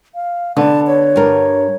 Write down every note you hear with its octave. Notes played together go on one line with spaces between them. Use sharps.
F5
D3 B3 A5
C#5
G2 A#4